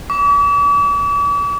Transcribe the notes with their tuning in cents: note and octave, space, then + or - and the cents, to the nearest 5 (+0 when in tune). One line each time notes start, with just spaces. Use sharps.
D6 -45